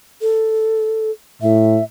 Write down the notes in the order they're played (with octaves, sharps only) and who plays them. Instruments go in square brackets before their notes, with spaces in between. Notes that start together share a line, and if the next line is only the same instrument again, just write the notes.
[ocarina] A4
[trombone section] A2 [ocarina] E5